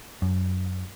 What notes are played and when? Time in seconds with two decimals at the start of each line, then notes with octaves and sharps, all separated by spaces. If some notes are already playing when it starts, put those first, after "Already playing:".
0.22 F#2